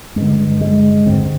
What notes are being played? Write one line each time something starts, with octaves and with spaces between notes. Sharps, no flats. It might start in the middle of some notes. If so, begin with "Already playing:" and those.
G2 D3 G#3
G#3
G2 D3 C4